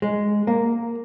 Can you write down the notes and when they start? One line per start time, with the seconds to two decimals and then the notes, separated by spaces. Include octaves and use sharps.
0.02 G#3
0.47 A#3